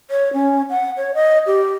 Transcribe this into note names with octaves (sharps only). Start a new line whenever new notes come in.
C#5
C#4
F#5
C#5
D#5
G4